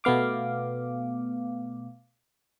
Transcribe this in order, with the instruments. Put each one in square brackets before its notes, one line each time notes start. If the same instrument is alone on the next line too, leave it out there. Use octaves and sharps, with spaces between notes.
[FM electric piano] B2 A3 B3 F5 D6